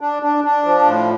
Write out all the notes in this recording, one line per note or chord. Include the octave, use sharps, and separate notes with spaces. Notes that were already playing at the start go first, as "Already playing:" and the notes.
D4
D4
D4
F3
A2